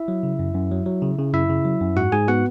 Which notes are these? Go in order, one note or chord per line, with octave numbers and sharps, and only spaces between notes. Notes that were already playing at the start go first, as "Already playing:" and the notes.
Already playing: E4 E5
F#3
C#3
F#2
F#2
F#3
F#3
C#3
C#3
F#2 E4 E5
C#3
F#3
F#2
G#2 F#4 F#5
G#2 G#4 G#5
B3 F#4 F#5